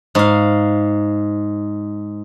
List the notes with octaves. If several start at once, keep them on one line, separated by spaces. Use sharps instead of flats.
G#2 F5